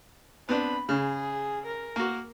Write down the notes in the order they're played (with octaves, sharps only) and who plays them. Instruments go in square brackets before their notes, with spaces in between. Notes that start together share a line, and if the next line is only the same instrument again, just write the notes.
[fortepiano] B3 C4 D4 [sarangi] B5
[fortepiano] C#3 [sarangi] G#4
[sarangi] A#4
[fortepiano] A#3 F#4